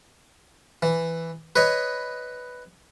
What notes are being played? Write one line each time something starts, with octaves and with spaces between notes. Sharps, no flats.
E3
B4 C#5 D#5